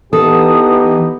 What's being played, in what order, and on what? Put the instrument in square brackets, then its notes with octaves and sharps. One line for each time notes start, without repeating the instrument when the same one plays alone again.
[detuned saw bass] E3 [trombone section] B3 D#4 G4 [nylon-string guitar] A4 [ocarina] D#6